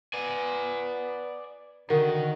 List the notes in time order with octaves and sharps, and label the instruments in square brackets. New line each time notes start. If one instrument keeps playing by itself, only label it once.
[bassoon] B3 [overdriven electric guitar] D5 G#5
[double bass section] D3 [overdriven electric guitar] D#3 [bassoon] F#4 [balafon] A#4